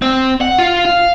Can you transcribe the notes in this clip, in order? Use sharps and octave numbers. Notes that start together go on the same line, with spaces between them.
C4
F#5
F4
F5